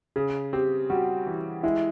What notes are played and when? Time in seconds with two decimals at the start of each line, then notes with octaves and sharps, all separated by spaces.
0.16 C#3 G#4
0.53 C4 G4
0.90 G3 F#4
1.26 E3
1.63 G#3 E4